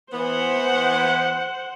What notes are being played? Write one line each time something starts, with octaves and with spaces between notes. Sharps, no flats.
E3 B3 C5 F#5